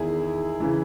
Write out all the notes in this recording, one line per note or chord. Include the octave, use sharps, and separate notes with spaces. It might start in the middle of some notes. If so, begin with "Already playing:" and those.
Already playing: E2 D#3 E4 G#4
C#3 E3